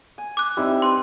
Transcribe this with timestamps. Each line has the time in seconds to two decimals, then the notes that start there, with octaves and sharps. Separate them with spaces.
0.18 G#5
0.37 D6 F#6
0.57 G3 C4 D#4 E4 G4
0.82 B4 C6